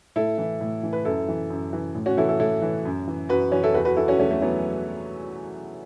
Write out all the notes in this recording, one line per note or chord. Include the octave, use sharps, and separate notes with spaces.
A2 E4 A4
E3
A2
E3
B4
F#2 E4 A4
E3
F#2
E3
A2
C#4 F#4
E3 E4 A4
E4 A4
A2 E4 A4
E3
F#2
E3
F#2 F#4 B4
E3 C#4 F#4
E4 A4
E2 F#4 B4
F#4 B4
E3 E4 A4
C#4 F#4
E2 A3 C#4
A3
E3 F#3 B3